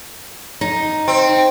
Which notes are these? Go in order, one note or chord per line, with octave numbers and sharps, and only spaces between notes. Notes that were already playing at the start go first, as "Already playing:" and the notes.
D#4
C4